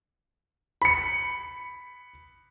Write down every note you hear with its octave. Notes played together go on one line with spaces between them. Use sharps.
B5 C#7